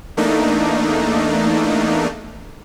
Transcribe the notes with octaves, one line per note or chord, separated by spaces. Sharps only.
E2 A3 A#3 D4 D#4